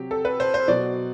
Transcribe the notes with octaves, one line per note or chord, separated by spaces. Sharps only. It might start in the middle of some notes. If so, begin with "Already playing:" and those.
Already playing: C3 F#3 G4
A4
B4
C5
C5
B2 F#3 D5